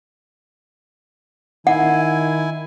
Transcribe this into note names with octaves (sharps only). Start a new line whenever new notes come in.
D#3 E4 F#5 G#5